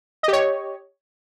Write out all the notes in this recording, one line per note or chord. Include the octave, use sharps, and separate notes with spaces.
G4 C#5 D#5